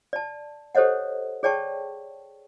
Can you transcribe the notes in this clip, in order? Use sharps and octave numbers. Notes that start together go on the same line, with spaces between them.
D5 A5
G4 A4 C5 C#5 D#5 F#5
G#4 C#5 D5 G5 A5 C#6